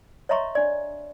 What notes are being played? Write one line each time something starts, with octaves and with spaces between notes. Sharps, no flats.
C#5 D#5 E5 A#5 C6 C#6
D4 D5